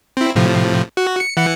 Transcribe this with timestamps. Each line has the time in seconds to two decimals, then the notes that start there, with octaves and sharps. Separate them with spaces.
0.17 C4 E4
0.35 A2 C3 F3
0.97 F#4
1.20 C#7
1.37 E3 F#5 C#7